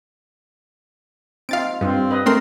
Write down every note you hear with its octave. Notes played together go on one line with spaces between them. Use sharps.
C4 D#4 F4 F5 A6 D7
G2 G3 C4 F4
B4 D#5
A3 C4 A#4 C6